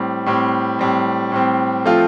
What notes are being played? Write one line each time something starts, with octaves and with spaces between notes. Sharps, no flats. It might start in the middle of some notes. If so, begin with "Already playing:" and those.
Already playing: A2 G3 C4
A2 G3 C4
A2 G3 C4
A2 G3 C4
F3 A3 C4 F4